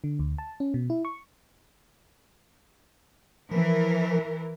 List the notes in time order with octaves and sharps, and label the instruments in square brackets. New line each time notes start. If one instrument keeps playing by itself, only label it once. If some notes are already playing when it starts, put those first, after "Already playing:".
[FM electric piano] D3
D2
A5
C#4
B2
E4
C#6
[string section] E3 A#4 [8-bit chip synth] F3